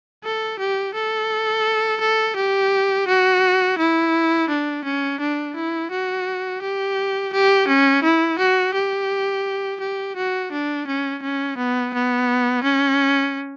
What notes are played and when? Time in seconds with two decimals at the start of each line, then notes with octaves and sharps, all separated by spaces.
0.24 A4
0.59 G4
0.94 A4
2.01 A4
2.37 G4
3.08 F#4
3.78 E4
4.49 D4
4.85 C#4
5.20 D4
5.56 E4
5.91 F#4
6.62 G4
7.33 G4
7.68 C#4
8.03 E4
8.39 F#4
8.74 G4
9.81 G4
10.16 F#4
10.52 D4
10.88 C#4
11.22 C#4
11.58 B3
11.94 B3
12.64 C#4